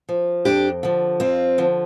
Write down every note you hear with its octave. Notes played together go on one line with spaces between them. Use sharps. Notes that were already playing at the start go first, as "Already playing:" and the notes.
F3
F2 D4 G4
D3 F3
F2 C4 F4
D3 F3